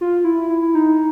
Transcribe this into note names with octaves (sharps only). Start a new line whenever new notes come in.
F4
E4
E4
E4
D#4